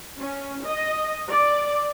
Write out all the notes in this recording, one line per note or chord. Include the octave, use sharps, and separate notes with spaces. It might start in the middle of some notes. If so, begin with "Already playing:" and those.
C#4
D#5
D5